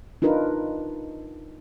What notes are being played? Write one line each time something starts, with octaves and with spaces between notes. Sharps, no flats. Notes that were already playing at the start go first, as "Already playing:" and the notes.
D4 D#4 F4 A#4 B4